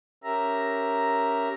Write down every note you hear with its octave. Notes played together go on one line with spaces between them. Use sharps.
C#4 G4 A#4 E5 A#5